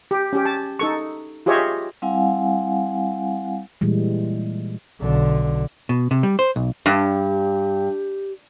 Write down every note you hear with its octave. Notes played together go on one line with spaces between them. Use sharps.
G4
C#4 G4
A5
D#4 A4 C#6
F4 G4 G#4 C#5 D#5 E5
G3 C4 E4 F5 F#5 G#5
A#2 E3 G3 G#3
B1 D3
B2
C3
G3
C5
B1
G2 G4